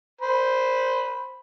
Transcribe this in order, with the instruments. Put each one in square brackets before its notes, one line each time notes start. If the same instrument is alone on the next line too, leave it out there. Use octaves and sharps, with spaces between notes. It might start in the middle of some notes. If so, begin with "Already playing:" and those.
[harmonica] C5 B5